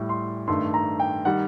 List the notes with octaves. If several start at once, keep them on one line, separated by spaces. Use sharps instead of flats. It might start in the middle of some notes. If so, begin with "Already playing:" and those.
Already playing: A2 G3
C6
G2 D#3 A3 C6
A#5
G5
D#3 G3 F#5